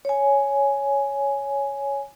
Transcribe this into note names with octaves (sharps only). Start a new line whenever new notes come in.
C#5 G#5